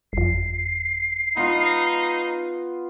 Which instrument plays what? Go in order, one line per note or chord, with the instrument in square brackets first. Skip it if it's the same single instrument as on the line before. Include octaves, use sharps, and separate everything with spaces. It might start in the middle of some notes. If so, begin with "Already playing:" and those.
[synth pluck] G1 F2 [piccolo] C7
[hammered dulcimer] B3 F4 [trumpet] D#4